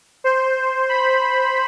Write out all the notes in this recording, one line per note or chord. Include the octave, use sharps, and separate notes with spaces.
C5
B5